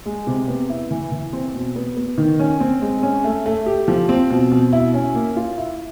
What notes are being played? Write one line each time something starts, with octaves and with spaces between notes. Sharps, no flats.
G#3
C3
B3
E4
E3
E3
C4
B2
B3
B3
D#3
C#4
C4
G#3
C#4
A3
A3
G4
F3
C4
B2
B2
E4
C#4
A#3
F4
E4